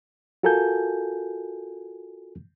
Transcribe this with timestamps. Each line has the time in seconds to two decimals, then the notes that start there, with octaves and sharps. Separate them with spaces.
0.43 F4 F#4 A4 A#4 G#5 G6